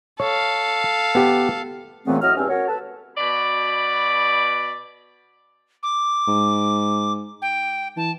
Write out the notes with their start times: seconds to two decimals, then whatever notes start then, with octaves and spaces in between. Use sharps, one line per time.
0.20 A4 C#5 F5
1.15 B3 G4
2.05 A#2 C#3 E3 A3 B3 C4
2.22 A2 F#3 D#5 F6
2.36 E2 G2 C4 C#4
2.49 C#4 F#4 A#4 C#5
2.67 A4 B4 A5
3.17 B2 D5 B5
5.83 D6
6.28 G#2
7.42 G5
7.97 E3 A5